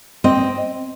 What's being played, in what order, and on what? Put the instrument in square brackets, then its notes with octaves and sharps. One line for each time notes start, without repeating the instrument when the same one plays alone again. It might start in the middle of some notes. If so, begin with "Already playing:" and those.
[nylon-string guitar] C4 D#5